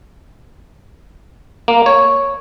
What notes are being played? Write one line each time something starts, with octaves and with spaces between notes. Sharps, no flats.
A#3
C#5